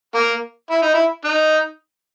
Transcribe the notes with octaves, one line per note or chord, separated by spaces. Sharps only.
A#3
E4
D#4
E4
D#4